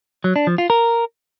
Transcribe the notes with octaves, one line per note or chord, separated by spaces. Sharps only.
F#3
D4
F3
F4
A#4